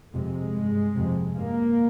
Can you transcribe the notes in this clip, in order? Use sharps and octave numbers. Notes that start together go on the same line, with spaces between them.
F2 C3 G#3
G2
F2 C3
G2 A#3